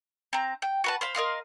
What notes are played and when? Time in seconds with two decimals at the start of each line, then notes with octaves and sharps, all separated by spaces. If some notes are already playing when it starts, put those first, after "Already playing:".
0.33 C4 A#5
0.62 G5
0.84 F#4 B4 A5
1.01 C5 F5 B5
1.15 A#4 D#5 F5 C6